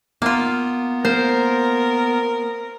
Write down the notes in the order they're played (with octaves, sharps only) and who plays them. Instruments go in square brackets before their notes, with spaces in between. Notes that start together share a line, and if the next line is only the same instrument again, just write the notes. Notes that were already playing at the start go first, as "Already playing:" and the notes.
[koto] A#3 F4 [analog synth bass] B3
[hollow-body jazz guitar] A#3 [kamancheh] A#4 [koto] C5